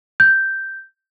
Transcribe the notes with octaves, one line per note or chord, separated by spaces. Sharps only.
G6